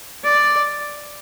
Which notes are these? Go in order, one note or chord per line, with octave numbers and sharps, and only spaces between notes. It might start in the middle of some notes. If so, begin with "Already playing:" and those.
D5